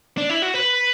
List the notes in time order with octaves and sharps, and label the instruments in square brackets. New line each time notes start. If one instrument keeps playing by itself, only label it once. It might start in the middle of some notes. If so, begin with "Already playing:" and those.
[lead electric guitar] D4
E4
F#4
B4